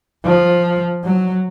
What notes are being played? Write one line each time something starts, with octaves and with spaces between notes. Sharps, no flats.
F3
F#3